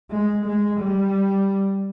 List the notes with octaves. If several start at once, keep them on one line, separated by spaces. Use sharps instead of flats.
G#3
G#3
G3